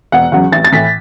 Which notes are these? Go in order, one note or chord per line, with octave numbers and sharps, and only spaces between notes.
E1 F#5
E2 C#3 F#3 F#5
A1 A6
A6
A2 E3 B6